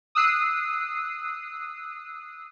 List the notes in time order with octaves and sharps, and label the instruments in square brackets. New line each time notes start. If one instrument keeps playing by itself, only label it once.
[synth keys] D#6 E6 F#6 C7 D#7